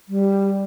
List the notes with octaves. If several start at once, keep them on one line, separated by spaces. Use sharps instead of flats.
G3